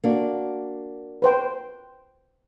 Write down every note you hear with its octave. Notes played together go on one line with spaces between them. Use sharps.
A#3 D4 F#4
B4 C5 G5